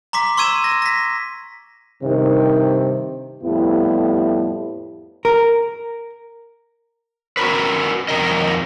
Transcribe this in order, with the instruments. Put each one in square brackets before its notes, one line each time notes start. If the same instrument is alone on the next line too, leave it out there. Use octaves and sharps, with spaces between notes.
[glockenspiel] A#5 C6 D6 B6
C6 C#6 E6 G#6 D#7 E7
A#6
A#6 B6
[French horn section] G2 C3 D#3
F2 A2 G3 B3 E4 G4
[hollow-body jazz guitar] A#4
[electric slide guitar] F#4 A#4 B4
F2 G3 A#4 D#5